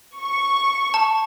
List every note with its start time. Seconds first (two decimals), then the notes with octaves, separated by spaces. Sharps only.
0.18 C#6
0.94 A5